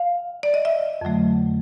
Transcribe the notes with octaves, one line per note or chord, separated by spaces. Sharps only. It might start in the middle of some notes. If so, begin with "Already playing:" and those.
Already playing: F5
D5
D#5
E5
F2 D3 F#3 A3